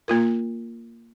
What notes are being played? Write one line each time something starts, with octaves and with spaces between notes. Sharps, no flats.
A#3 F4 A#4